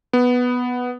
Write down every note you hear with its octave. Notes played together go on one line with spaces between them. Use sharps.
B3